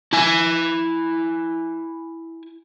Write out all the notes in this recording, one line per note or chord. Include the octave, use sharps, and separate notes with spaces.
E4 G#5